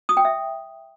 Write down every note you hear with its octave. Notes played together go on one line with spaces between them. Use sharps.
D#6
G5
E5